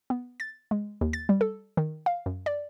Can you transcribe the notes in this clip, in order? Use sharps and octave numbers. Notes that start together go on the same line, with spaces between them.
B3
A6
G#3
D#2
A6
G3
A4
D#3
F5
F#2
D5